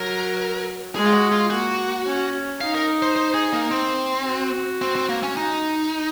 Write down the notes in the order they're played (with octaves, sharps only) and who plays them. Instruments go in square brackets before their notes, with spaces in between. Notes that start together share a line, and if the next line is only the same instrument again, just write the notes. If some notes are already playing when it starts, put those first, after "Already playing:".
Already playing: [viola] F#3 [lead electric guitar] A#4
[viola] G#3 [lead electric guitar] G#4
[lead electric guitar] F4
F#4
F4
[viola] A#3 [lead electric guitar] F#4
[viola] C#4
[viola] D#4 [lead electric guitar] F5
[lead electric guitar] A#4
C5
C5
G#4
A#3
C4
[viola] F#4
[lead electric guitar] C4
C4
A#3
C#4
D#4